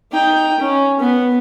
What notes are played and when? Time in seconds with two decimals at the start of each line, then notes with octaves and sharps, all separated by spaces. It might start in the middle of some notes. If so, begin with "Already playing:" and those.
0.12 D#4 G5
0.60 C#4
1.00 B3